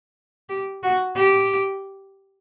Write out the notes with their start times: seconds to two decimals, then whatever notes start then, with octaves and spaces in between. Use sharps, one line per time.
0.49 G4
0.83 F#4
1.16 G4